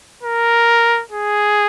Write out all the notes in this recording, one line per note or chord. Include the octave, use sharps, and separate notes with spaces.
A#4
G#4